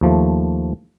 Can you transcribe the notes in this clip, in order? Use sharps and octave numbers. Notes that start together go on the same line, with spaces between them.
D#2 F3 A3